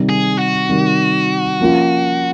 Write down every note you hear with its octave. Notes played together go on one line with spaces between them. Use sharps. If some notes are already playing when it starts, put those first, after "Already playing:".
Already playing: C3 D#3 G3
G#4
F#4
C3 D#3 G3
F3 A#3 C#4 F4